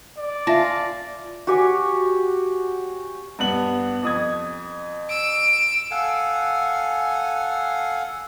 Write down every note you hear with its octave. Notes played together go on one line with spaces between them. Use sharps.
D5
F4 E5 G#5 A5 A#6
F#4 G4 C#5 G#5
G2 B3 F#7
F2 D#6 G#6
E6 D7
A4 F5 F#5 G#5